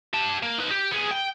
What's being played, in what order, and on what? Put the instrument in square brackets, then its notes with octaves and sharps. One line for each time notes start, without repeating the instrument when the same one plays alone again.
[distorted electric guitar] G4 A5
A#3
D#4 B4
G4
B3 G#4
G5